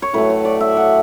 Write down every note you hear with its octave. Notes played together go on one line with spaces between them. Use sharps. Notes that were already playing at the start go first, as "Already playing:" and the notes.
C#5
A2 F#3 A3 B4
C#5
D5
E5
F#5